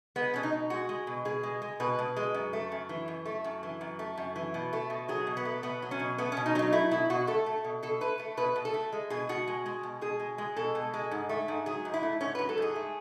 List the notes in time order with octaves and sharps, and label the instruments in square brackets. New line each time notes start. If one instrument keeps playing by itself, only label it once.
[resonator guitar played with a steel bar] G#3 B3
B2 C#4
D#4
B2
G#3 F#4
G#3
B2
B2 G#4
G#3
G#3
B2 B4
B2
G#3
F#2
A3
F#2
E3
F#2
A3
F#2
E3
F#2
A3
F#2
E3
B2
A3
B2
F#3 G#4
B2
B3
A3
B2 B3
F#3
C#4
B2
A3 B3
C#4
B2
D#4
F#3 C#4
D#4
A3 E4
B2 E4
B2 F#4
A3 A4
A3
B2
B2 A4
A3 B4
A3
B2 B4
B2
A4
A3
G#3
B2 G#4
B2 F#4
G#3
G#3
B2
B2 G#4
G#3
G#3
B2 A4
B2
G#3
G#2
A3
G#2
F#3 G#4
G#2
E4
A3
G#2 C#4
F#3 B4
A4
G#2 G#4
A3